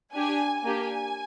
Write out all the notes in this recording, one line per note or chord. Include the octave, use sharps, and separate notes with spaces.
D4 G4 G#5
A#3 D4 G4 G#5